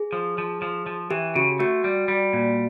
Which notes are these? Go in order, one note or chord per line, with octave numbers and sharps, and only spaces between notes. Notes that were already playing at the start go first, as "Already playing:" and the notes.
Already playing: G#4
F3
F3
F3
F3
E3 G4
C#3 F#4
A3 F#4
G3
G3
A#2